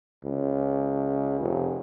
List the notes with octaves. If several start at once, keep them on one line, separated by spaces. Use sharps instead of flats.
C#2
F1